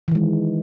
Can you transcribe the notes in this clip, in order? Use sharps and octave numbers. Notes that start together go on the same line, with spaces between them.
D#3 E3 G#3